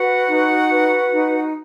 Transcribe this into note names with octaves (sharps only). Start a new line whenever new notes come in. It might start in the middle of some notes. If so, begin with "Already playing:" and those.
Already playing: F#4 B4 F#5
D#4
B4
D#4